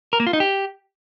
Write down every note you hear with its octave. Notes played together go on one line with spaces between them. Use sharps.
A#4
A#3
F4
D#4
G4